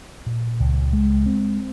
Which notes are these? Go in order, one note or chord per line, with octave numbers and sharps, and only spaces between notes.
A#2
C#2
G#3
C4